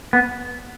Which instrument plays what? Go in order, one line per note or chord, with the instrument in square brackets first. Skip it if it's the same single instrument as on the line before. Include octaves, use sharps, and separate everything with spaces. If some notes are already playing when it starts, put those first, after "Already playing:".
[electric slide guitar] B3